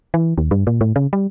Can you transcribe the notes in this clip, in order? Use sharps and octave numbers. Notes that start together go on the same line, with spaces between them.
E3
D#2
G2
A#2
A2
C#3
G3